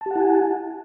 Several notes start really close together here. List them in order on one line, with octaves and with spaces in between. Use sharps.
A5 G4 F#5 E4 G#5